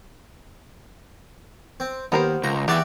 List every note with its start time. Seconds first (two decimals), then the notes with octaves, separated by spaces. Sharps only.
1.80 C4
2.12 D#2 B3 A#4 C5
2.44 C#2 A#5
2.68 E2 E3 F#4 G4 D5 E5